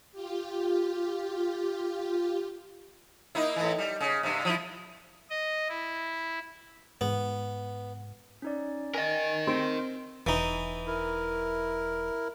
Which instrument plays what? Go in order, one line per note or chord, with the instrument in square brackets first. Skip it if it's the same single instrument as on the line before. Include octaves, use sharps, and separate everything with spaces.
[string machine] F4 G4
[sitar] A#3 D#4 E4
A2 E3
G3
C#3
G2 C3
F3 E4
[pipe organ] D#5
E4
[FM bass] G#2 [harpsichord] B3
[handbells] C#4 D#4 D5
[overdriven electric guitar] A#4 D#5 [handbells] G#5 A6
[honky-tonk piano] C4 [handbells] C6 D7
[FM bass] E1 [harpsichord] E3 D#4
[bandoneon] E4 A#4